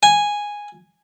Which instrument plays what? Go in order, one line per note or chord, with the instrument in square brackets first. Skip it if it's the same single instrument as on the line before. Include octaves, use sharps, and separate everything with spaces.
[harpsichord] G#5